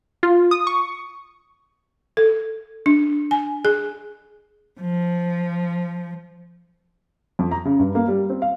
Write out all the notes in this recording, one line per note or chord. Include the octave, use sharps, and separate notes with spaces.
F4
D#6
C#6
A4
D4
G#5
G#4
F3
F2
A#5
C#3
G2
A#3
G3
C4
F5